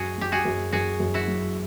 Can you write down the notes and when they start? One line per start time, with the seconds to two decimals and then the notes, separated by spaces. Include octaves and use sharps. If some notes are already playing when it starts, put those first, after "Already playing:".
Already playing: F#2 F#4 G#4
0.18 F#3 G4
0.32 F#4 G#4
0.45 F#2
0.72 F#2 F#4 G#4
1.00 F#2
1.14 E4 F#4
1.28 F#3